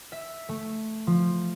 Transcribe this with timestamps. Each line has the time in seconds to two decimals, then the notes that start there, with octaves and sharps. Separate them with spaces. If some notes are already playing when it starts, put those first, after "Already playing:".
0.12 E5
0.49 A3
1.07 F3